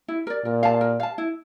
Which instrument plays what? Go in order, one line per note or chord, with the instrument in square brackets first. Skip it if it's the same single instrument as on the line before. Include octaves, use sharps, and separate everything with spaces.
[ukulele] E4
A#4 D5
[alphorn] A#2 [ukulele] A#4
[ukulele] F5 A5
A#4
F5 A5
E4